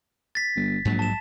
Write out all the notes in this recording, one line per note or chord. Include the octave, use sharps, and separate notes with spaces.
A6 B6
G1
A#1 G#2 F#3 G#3
A5 E7